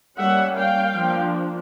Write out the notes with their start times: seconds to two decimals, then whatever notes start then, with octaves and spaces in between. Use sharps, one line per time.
0.18 G3 A#3 C#4 E5 F#5
0.56 F5 G5
0.95 F3 A#3 D4